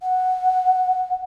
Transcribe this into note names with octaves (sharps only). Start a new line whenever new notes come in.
F#5